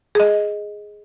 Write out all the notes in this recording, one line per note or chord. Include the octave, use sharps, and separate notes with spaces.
G#4 D#5